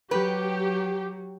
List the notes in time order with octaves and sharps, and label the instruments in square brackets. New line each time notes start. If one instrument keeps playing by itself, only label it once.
[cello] F#3 [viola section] G4 [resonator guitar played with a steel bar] B4